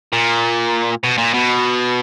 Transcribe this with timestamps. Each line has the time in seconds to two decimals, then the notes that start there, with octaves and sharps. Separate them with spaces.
0.13 A#2
1.04 B2
1.18 A#2
1.34 B2